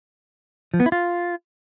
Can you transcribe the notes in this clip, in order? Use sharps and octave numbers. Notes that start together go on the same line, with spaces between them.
F3
B3
E4
F4